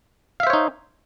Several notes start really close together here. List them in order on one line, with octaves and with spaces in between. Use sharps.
F5 E5 C5 C#5 D#4